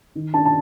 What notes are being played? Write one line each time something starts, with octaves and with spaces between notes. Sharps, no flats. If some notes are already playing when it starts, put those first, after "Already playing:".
D#3
D4 A5
A5